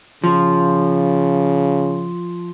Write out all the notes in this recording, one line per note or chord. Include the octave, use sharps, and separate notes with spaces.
C#3 F3